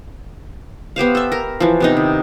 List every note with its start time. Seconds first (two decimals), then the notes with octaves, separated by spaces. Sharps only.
0.96 B3 G4 C5 F5
1.15 A4 E5
1.32 A#4
1.60 E3 F3
1.80 C3 B3 D#4
1.97 D#3